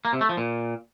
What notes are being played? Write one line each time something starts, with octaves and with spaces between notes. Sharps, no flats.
A#3
C3
A3
F3
A#2